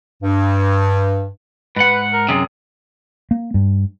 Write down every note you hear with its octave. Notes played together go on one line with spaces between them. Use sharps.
G2
G#2 B4 F#5
A#4
F#2 C3 G#4
A#3
G2